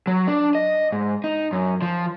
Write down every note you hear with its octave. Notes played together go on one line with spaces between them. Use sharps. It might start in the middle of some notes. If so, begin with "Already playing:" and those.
F#3
D4
D#5
G#2
D#4
F#2
F3